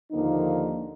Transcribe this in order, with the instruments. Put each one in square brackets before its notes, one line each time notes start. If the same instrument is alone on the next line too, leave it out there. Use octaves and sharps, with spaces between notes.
[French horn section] D#2 D3 F3 A#3 D#4